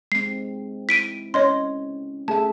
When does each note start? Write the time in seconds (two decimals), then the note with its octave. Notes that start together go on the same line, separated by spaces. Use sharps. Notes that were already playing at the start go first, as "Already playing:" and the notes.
0.12 G#3 C4 C7
0.89 E4 B6 D7 D#7
1.34 C#4 C#5 D#5 C6
2.28 A3 G#4 E5 A5